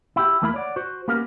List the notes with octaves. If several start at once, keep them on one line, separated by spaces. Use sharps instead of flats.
E4 G4
E2 A3 A#3 E4 F5 B5
C#5 D5 F#5
F#4 C5
A#3 B3 C#4 G4 A#4 F5